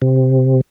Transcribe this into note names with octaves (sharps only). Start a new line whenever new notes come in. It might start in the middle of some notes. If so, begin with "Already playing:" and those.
C3